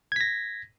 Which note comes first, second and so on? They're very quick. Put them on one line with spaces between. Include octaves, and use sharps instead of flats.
G#6 B6 A#6